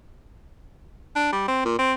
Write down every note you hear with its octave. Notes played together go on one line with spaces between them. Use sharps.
D4
G3
C4
A#2
C4